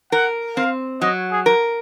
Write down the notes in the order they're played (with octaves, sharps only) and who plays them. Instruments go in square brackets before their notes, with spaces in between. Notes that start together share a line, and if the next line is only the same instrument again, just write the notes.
[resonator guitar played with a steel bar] A#4 [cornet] F#5
[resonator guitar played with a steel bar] C4 [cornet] F5
[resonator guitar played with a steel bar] F#3 [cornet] D#5
[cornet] G#4
[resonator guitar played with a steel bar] A#4